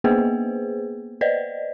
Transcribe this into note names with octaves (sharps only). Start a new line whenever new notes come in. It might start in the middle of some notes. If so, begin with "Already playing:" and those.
A#3 B3 G#4 B4 C5
B4 C5 D5 D#5